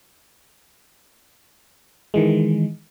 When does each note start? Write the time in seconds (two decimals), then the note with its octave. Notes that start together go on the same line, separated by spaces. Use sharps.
2.14 D#3 E3 G#3